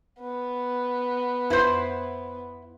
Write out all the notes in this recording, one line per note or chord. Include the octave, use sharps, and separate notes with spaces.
B3
F2 E4 B4 C5 G6